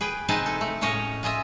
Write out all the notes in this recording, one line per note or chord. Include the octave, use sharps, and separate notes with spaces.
G#4 B4 G5
C3 C4 D#4 G#4 B4 A5
A4
A3
A2 G#3 C#4 C#5 D#5 F5
F4 G#4 D#5 E5